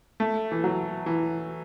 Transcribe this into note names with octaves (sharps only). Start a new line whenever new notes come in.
A3
E3
F#3
E3